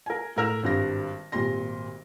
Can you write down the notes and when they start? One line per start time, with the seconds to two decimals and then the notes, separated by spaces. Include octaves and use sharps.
0.06 A#4 G#5
0.36 A2 A3 A#4 E6 F6
0.63 G#1 G2 A#6
1.32 G#1 A#2 G3 C6 A#6